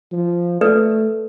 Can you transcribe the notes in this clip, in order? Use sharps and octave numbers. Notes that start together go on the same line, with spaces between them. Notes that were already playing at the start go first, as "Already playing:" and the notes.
F3
A3 A4 B4 D5